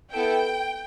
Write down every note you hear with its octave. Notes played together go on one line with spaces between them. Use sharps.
B3 E4 A4 G5